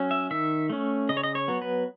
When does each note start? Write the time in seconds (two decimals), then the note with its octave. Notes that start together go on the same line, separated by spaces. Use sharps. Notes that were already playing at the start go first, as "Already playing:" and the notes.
Already playing: F#3 C#4
0.11 E5
0.31 D#3 E5
0.70 A3 C#4
1.09 C#3 D#5
1.17 C#5
1.23 D#5
1.35 C#5
1.48 F#3 B3
1.62 B4